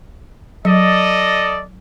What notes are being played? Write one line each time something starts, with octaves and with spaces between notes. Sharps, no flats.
F#3 A4 D5 D#5